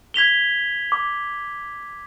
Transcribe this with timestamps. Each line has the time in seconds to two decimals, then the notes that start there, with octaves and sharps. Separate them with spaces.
0.14 G#6 B6 F7 G7
0.92 D6